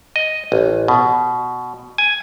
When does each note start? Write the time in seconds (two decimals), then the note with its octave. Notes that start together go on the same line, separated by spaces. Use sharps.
0.16 D#5
0.52 A1
0.88 B2
1.98 G#5